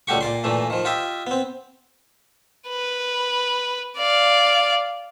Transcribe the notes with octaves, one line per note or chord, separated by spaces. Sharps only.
C#2 G3 A3 F#4 G4 C#6
A#2 D5 C6
G2 A#2 E3 A3
D#3 F3
F4 G4 D#5 E5
B3 C4
B4
D5 F5